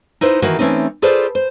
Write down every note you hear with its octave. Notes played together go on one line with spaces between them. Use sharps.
D#4 E4 B4 C5
D#3 E3 A#3 F#4
E3 A3 C4 C#4 D#4
F4 G#4 A4 B4 C5 D5
C5